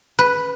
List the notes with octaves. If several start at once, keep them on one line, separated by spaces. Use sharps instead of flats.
B4